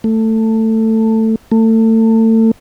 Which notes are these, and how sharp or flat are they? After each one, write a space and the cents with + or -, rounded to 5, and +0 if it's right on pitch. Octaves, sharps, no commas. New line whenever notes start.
A3 +15
A3 +30